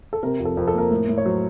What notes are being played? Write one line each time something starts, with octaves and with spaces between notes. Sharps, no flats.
A4
C3 A#4
F2
A4
F2 A#4
A4
A#3 A#4
A2
A2
C#5
F#3 C5